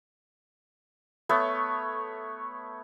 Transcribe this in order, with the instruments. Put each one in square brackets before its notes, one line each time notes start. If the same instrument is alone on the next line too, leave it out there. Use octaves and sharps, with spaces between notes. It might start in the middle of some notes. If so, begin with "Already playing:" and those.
[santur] A3 B3 C#5